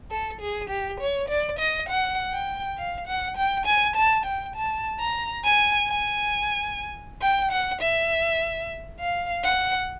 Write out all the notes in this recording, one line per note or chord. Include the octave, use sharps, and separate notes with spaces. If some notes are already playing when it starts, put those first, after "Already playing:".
A4
G#4
G4
C#5
D5
D#5
F#5
G5
F5
F#5
G5
G#5
A5
G5
A5
A#5
G#5
G#5
G5
F#5
E5
F5
F#5